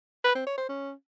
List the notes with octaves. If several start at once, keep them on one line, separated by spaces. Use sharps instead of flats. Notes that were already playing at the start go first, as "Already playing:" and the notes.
B4
C4
C#5
C5
C#4